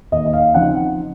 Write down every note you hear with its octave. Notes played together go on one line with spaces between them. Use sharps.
D#2 D#5
D#5
F5
C#3 F3 C4 D#4 F#5